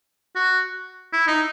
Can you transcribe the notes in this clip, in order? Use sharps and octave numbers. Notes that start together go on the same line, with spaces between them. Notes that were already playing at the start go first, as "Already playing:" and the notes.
F#4
E4
D#4